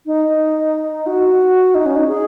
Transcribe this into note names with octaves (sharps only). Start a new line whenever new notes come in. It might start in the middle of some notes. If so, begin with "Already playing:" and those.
D#4
F#4
D#4
C#4
D#4
G#4